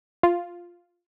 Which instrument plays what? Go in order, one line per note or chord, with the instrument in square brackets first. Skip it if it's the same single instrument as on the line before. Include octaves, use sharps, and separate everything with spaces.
[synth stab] F4